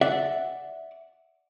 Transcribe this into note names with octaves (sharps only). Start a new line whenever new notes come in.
D5 E5 F#5